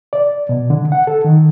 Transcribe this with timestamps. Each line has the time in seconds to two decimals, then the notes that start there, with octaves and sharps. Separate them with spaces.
0.13 D5
0.49 B2
0.70 D3
0.92 F#5
1.07 A4
1.25 D#3